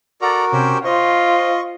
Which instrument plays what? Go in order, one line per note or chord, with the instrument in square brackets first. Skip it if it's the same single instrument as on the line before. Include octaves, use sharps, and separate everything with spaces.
[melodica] F#4 A#4 [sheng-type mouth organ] A4 D5 A#5
[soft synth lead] C3 [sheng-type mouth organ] C#4 G4 C5
[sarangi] F4 [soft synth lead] C5 [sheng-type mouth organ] D#5 [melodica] C#6